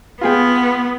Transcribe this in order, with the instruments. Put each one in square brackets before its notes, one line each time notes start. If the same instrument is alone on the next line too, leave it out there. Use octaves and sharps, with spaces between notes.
[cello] B3 [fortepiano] F4 G#4 G5